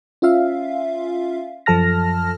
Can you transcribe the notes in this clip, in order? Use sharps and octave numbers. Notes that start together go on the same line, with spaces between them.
C#4 F4 E5 F5
F#2 F3 A4 A5 F6 A#6